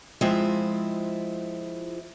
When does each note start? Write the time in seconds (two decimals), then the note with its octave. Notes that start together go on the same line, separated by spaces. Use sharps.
0.21 F3 G#3 C4 E4 F4 E5